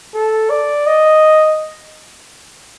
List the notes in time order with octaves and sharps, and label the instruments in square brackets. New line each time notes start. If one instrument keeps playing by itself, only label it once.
[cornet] A4
D5
D#5